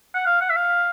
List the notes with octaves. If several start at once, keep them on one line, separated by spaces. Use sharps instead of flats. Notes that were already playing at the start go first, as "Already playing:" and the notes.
F#5
F5
F#5
E5
F5